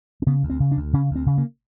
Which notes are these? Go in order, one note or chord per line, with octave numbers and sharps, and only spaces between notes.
C4
C#3 B3
D2
C4
C#3
D4
D2
C#3 C#4
D2 C4
C#3
A#3